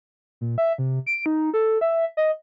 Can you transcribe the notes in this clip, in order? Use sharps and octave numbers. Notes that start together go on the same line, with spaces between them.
A#2
E5
C3
D7
D#4
A4
E5
D#5